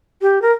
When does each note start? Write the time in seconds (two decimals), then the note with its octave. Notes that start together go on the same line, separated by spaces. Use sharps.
0.22 G4
0.42 A#4